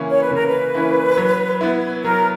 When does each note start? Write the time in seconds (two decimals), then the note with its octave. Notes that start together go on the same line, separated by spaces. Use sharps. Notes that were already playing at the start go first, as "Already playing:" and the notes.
Already playing: C#3 E3 A#3 C#4 E4
0.10 C#5
0.22 B4
0.31 C#3 A#4
0.46 B4
0.74 E3 A#3 C#4 E4
1.17 F#3
1.61 B3 E4
2.04 F#3 A#4